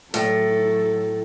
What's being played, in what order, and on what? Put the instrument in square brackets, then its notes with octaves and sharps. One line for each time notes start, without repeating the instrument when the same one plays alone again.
[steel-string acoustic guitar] A2 [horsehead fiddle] F#3 A4